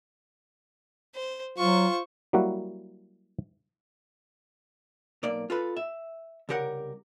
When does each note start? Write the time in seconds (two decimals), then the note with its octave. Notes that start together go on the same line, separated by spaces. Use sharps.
1.15 C5
1.58 F#3 F4 C5 C#6
2.33 F#3 G3 A#3 E4 F#4
5.23 B1 A#3 D5
5.50 F4 A4 B4
5.77 E5
6.49 C2 C#3 G4 A#4 F#5